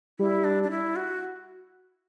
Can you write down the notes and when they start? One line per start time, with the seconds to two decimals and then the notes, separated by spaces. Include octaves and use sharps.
0.19 G3 E4
0.44 D4
0.63 D4
0.71 E4
0.96 F#4